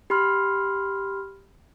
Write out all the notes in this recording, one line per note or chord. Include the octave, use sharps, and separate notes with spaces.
G4 B5 C6 F6